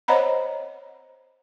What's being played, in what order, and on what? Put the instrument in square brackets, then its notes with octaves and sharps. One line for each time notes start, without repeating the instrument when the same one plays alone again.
[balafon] C5 C#5 D#5 F#5 A#5 B5